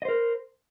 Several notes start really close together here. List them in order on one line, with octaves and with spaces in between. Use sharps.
D#5 C5 A#4